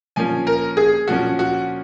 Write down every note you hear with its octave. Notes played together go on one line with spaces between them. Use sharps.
A#2 F3 A#3 C#4 G#5
A#4
G#4
A#2 F3 A#3 C#4 F#4
F#4